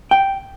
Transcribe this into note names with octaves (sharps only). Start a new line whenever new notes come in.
G5